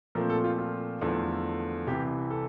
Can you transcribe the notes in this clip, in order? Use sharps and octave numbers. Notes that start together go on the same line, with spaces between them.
A#2 F3 A3 C4 A#4
A4
F4
F4
E2 D3 F3 A3
C2 C3 E3 G4
A4